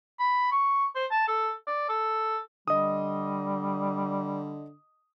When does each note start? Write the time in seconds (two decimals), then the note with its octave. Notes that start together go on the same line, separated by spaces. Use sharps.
0.19 B5
0.51 C#6
0.96 C5
1.11 A5
1.28 A4
1.67 D5
1.89 A4
2.68 D3 G3 D#5 D#6